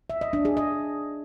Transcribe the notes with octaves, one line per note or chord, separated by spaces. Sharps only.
E5
D#5
D4
G#4
D#5